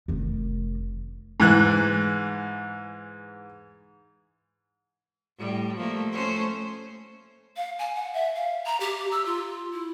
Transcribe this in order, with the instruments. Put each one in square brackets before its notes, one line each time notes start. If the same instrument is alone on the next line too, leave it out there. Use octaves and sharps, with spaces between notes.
[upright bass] F1 D#3
[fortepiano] G#2 E3 F#6
[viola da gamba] A2 G3
F3 A3 A#3
A3 C#4 C5
[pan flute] F5
G#5
F#5
E5
F5
A#5
G4
E6
F4
E4